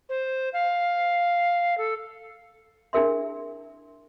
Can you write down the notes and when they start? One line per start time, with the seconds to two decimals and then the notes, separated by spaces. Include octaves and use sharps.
0.09 C5
0.53 F5
1.78 A4
2.93 D4 E4 G#4 A#4 E5 C6